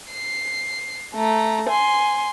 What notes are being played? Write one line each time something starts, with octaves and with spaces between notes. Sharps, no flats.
C7
A3 A#5
G#5 C6